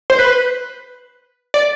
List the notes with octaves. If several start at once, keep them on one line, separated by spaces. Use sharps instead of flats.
C5
B4
D5